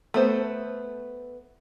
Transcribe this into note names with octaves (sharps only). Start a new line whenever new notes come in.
A3 B3 C5